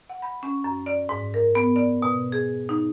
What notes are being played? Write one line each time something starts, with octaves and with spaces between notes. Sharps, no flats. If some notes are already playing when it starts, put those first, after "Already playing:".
F#5
B5
C#4
F#2
D5
G#2
A#4
B3
D5
B2
G#4
D#4